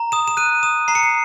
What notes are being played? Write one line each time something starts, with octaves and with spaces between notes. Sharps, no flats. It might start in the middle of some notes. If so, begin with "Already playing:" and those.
Already playing: A#5
D#6 E7
E7
F#6 D#7
D#6 E7
A#5 C7
C#7
C7